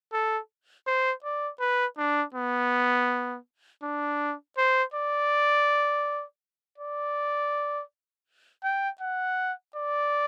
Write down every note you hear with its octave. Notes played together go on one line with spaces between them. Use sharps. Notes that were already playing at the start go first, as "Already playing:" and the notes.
A4
C5
D5
B4
D4
B3
D4
C5
D5
D5
G5
F#5
D5